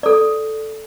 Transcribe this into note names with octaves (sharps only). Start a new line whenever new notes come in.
A4 D5